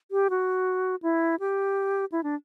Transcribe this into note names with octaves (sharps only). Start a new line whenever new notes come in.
G4
F#4
E4
G4
E4
D4